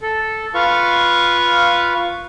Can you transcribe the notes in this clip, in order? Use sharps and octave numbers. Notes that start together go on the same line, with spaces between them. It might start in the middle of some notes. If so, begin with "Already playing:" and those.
A4
F4 B4 F5 C#6